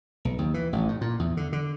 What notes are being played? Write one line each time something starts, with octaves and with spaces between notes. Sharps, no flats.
B1
D#2
E3
A1
A2
A#2
E2
D3
D3